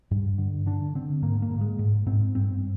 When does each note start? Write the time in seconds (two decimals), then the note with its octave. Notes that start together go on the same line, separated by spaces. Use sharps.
0.11 G2
0.38 D3
0.66 D3 D4
0.95 D3 C4
1.22 G#2 A#3
1.42 A#3
1.51 G#2
1.61 G#3
1.79 G#2
2.06 G#2 C4
2.35 G2 C4